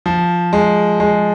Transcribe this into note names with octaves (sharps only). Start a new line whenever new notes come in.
F3
G#3
G#3